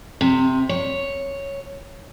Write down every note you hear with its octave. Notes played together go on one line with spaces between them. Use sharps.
C3
C#5